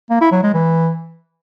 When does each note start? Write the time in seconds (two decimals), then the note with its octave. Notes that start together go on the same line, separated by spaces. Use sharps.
0.10 A#3
0.21 E4
0.32 F#3
0.43 G#3
0.54 E3